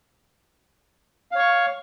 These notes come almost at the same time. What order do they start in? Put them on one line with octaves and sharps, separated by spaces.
F5 C#5 C#6